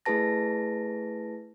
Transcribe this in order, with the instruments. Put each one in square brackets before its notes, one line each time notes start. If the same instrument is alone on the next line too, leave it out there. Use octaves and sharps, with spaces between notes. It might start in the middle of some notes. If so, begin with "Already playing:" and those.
[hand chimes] A3 E4 G#4 B4 A5 A#6